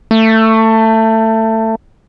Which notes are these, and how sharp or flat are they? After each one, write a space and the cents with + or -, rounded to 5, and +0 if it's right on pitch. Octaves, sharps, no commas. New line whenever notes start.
A3 +20